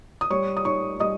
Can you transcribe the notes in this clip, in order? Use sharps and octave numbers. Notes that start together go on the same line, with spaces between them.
D#6
G3 C#5 C#6
D#6
D#4 C#5 C#6
G3 D#5 D#6